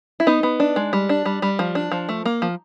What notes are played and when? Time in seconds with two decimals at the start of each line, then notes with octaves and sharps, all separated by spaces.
0.20 E4
0.27 B3 D#4
0.43 B3
0.60 D4
0.76 G#3
0.93 G3
1.09 D4
1.26 G3
1.42 G3
1.59 F3
1.75 D4
1.92 F3
2.09 A3
2.25 A#3
2.42 F3